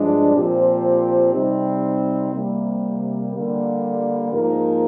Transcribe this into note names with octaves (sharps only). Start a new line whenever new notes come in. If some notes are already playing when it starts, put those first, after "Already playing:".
Already playing: G2 F3 G#3 D4
A#2 F3 C4 G4 C5
C3 G3 C4 D#4
C3 G3 A#3
D3 G3 A#3
G#2 F3 A#3 D#4 A#4